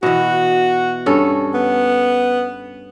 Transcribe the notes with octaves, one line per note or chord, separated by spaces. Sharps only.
B2 E3 F#4
G2 C#4 A4
B3